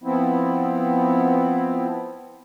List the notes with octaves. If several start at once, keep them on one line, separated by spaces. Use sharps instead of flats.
F3 B3 C4 E4